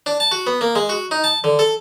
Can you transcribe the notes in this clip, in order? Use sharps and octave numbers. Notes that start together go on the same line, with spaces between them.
D4
A5
F#4
B3
A#3
G#3
F#4
D#4
A5
D3
A4